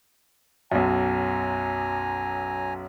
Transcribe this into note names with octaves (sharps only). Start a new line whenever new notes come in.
B1 F#2 G#5 A#5